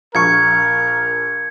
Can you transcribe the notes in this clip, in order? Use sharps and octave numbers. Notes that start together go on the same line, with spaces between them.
A#1 A#4 C#6 G#6 C#7